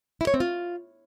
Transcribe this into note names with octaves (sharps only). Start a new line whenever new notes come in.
E4
C#5
C4
F4